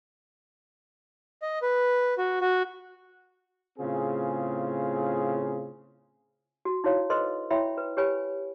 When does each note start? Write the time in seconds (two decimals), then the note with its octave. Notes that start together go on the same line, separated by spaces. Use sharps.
1.42 D#5
1.62 B4
2.18 F#4
2.41 F#4
3.79 A2 C#3 C4 F4 G#4
6.65 F#4
6.84 D#4 E4 F#4 C#5 F5
7.10 A4 B4 C5 D#5 C6
7.50 E4 C#5 E5 G5 B5 C6
7.77 B4
7.97 G4 B4 C#5 G#5 B5